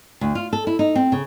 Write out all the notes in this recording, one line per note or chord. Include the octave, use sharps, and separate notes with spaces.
D2
F4
A4
E4
D#4
C4
C#3